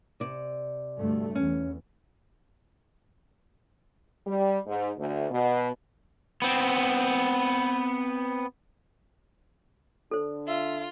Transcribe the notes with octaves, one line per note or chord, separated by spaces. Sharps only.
C3 D5
D2 G2 A3
E2 C#4
G3
G#2
D2
B2
B3 C4
D3 D4 A4 C5
F4 E5